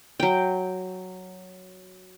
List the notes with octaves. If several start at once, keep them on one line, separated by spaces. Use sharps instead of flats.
F#3 G5